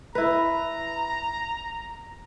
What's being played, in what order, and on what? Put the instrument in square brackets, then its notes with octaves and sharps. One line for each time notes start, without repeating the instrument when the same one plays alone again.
[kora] E4 B4 [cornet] A#5